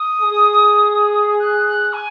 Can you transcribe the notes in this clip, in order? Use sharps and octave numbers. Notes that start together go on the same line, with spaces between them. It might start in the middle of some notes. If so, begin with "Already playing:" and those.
Already playing: D#6
G#4
F#6
F#6
G#5